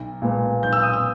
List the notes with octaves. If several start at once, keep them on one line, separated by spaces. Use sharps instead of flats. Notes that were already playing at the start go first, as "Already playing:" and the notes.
Already playing: B1
A#2 G#3 B3
B1 G6
E6
D#6
E6